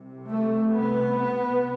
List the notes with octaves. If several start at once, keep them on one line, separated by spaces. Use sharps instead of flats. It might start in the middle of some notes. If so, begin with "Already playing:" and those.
Already playing: C2 C3
A3
B3